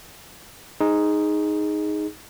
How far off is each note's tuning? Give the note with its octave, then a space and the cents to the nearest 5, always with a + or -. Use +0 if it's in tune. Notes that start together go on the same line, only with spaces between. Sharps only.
D#4 +0 G#4 +0